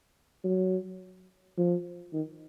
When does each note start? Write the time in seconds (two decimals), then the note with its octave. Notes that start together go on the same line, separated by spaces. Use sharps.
0.44 F#3
1.58 F3
2.13 D#3